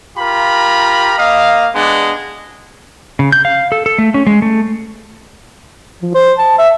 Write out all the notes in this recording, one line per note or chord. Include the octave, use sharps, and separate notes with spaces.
F4 G4 A#4 A#5 B5
A#3 D#5 F5
G#3 B3 D4
C#3
G6
F5
A4
A4
A3
C#4
G#3
A3
F3
C5
A5
E5